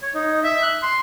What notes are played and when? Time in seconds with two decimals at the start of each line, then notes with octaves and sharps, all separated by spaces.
0.02 C#5
0.14 D#4
0.44 E5
0.63 F#6
0.83 C6